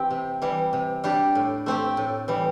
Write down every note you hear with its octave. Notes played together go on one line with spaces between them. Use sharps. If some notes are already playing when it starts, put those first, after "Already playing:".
Already playing: E3 C4 G4
C3
E3 G3
C3
G3 D4 G4
A2
A3 C4 G4
A2
E3 G3